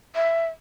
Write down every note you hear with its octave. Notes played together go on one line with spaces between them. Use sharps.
E5